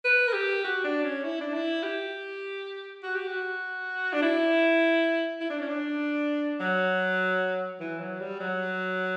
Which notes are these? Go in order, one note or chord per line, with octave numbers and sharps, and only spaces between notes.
B4
A#4
G4
F#4
D4
C#4
E4
D4
E4
G4
F#4
G4
F#4
D4
E4
E4
D4
C#4
D4
F#3
E3
F#3
G3
F#3